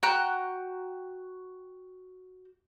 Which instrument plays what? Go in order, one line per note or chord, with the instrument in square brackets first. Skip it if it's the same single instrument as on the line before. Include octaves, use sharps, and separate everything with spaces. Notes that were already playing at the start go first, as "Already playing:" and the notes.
[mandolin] F#4 G5 A#5 F#6